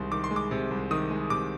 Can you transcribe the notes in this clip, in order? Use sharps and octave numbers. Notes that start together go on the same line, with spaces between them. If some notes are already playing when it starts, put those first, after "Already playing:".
Already playing: C2 C3 D#3 G#3 C6
D#3 D6
C6
G#3
D6
C3
C2
D#3 D#6
G#3
C3 D6